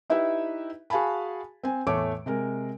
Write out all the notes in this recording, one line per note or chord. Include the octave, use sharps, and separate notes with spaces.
D#4 E4 G4 B4 E5
F#4 G#4 F5 G#5 A5 B5
C4 G#5
E2 A2 A3 C#5 D6 D7
C3 G#3 A#4